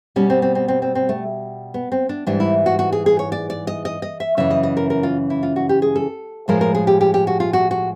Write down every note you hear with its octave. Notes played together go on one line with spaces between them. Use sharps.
B2 G3 C#4
C4
C4
C4
C4
C4
C4
A3
B3
C4
D4
G#2 E3 G3 D4
E4
F#4
F#4
G#4
G#4
C#5
D5
D5
D#5
D#5
D#5
E5
F#2 C#3 E3 E5
D#5
D#5
A#4
A#4
F4
E4
F4
F#4
G4
G#4
A4
A2 F3 G#3 A#4
A#4
G#4
G4
G4
G4
F#4
F4
F#4
F#4